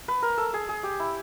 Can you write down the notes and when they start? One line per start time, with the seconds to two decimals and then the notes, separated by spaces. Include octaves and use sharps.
0.08 B4
0.22 A#4
0.38 A4
0.53 G#4
0.69 G#4
0.83 G4
1.00 E4